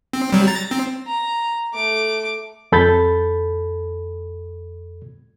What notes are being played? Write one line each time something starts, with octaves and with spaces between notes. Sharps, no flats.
C4
F#3 G3
A#5 A6
C4
A#5
A3 D6
F2 A4 B5 G6 A6